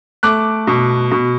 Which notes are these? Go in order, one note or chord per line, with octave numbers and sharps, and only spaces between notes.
A3 D6 F#6
B2
B2